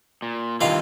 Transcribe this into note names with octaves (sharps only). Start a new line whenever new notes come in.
A#2
G2 C3 D#3 E3 F4 F5